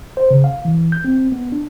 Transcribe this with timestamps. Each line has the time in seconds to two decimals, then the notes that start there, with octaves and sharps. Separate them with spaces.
0.17 C5
0.31 C#3
0.44 F5
0.65 E3
0.92 G6
1.05 C4
1.32 B3
1.52 D4